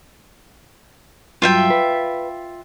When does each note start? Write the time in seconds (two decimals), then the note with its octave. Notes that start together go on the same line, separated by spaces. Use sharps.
1.42 G2 F#3 F4 E5 G5
1.70 B4